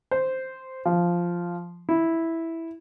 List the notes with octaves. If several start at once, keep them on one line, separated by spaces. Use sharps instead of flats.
C5
F3
E4